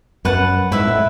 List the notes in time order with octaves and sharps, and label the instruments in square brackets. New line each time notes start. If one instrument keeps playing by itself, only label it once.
[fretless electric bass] F#2 [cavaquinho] B4 F#5 A5
[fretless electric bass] G#2 [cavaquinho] E4 B4 E5
[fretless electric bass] A2